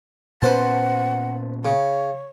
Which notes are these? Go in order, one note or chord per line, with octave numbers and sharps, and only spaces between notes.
A#2 B3 C#4 B4 C5 F#5 A5
C#3 C#5